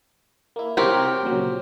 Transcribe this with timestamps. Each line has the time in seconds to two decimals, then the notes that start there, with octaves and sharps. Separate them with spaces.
0.56 A#3 E4
0.77 C3 C4 G4 A#4 C#5
1.23 A#2 C#3 F#3